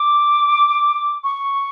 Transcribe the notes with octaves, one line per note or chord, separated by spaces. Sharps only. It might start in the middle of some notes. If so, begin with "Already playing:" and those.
Already playing: D6
C#6